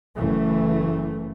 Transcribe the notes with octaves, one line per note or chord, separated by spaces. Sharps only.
F#1 E3 A3